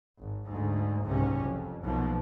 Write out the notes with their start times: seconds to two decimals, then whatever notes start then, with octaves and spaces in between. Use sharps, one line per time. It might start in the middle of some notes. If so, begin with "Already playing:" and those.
0.18 G#1
0.48 D2 G#2
1.04 F#1 C2 G#2 C3 C#4
1.41 F2
1.84 B1 B2 F3 A#3